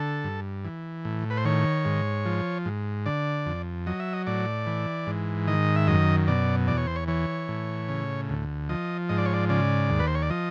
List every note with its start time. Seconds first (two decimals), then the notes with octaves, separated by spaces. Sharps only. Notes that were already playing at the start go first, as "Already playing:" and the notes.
Already playing: D3 A4
0.24 G2
0.65 E3
1.05 A2
1.30 B4
1.37 C5
1.45 D#3 C#5
1.85 G#2
2.25 F3
2.65 G#2
3.06 D3 D5
3.46 F2
3.87 F#3 D#5
4.00 E5
4.13 D#5
4.27 A2 D5
4.67 E3
5.07 G#2
5.47 D#3 D#5
5.76 E5
5.88 F#2 D#5
6.28 B2 D5
6.68 E2 D5
6.77 C#5
6.87 C5
6.96 C#5
7.08 E3 C#5
7.48 A2
7.89 C#3
8.29 D2
8.69 F3 D#5
9.09 G#2 D#5
9.18 D5
9.25 C#5
9.34 D5
9.50 C#3 D5
9.90 D#2
10.00 B4
10.07 C5
10.15 C#5
10.22 D5
10.30 F3 D#5